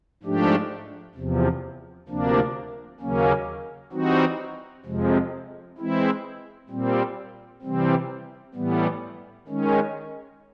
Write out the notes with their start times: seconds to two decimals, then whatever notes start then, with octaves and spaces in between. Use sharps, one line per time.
0.23 G#2 F3 A3 D4 G4
1.15 E2 C3 F3
2.08 D2 C3 F3 A#3 D4
3.00 D#2 C#3 F#3 A#3 C#4
3.93 E3 G3 C4 D#4 F#4
4.85 F2 C3 F3 G#3
5.78 E3 G#3 C4 E4
6.69 A#2 G3 C4
7.62 C3 E3 G3 C4
8.54 A2 E3 G3 B3
9.48 D#3 G#3 C#4